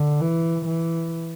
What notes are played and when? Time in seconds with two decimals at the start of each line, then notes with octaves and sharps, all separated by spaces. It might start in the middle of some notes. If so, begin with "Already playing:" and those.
Already playing: D3
0.21 E3
0.66 E3